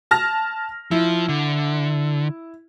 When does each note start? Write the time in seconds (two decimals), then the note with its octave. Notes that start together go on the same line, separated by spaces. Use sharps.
0.11 A5 F6 A#6
0.91 F3 E4
1.29 D3